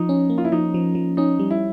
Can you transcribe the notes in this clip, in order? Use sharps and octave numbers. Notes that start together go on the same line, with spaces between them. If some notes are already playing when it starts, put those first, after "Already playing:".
Already playing: F3 D#4
C#4
A#3
F4
E4
F3 D#4
F3
F3
C#4 D#4
G3
E4